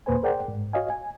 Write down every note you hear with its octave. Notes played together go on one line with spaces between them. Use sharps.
D#2 A#2 A#3 B4 C5 G#5
G#4 A#4 C5 D5 F#5 G5
G#2
F#4 C#5 D#5 F5 G#5
G#5